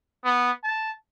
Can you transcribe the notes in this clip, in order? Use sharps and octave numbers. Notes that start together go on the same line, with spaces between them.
B3
A5